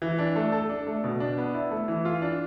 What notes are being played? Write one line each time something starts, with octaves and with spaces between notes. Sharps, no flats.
E3
D4
A3
A4
D4
A3
B2
D4
B3
E4
A3
E3
F4
D4